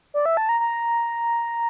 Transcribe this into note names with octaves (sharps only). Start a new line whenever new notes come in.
D5
E5
A5
A#5
A#5